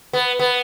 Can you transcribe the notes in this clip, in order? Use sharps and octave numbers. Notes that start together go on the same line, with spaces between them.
B3
B3